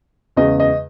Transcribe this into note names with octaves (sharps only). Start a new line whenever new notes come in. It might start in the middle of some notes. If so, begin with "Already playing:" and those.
E2 C#3 G#3 D#5
D#5